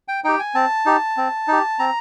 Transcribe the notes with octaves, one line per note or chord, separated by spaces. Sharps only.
G5
D#4 G4 G5
G#5
C4 A5
D#4 G4
C4
D#4 G4
C4 A#5